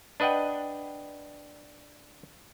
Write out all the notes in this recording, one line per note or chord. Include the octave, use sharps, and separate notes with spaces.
D4 B4 D#5 F#5 G5